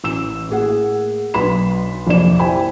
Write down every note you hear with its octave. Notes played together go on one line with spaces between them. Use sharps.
A1 E6 E7
A2 A#3 G#4 F#5
B1 D4 B4 B5 C6 E7
A#1 F2 C3 A#3 D5 E7
E4 G4 C5 G5 G#5 B5